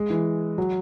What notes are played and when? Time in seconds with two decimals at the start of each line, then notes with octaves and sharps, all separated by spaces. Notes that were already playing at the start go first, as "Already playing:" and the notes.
Already playing: G#3
0.10 E3
0.58 F#3